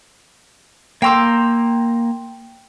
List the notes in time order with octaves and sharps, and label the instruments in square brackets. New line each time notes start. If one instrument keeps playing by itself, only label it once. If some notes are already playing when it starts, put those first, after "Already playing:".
[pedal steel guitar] A#3 A#5 E6 [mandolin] G5 C6 D6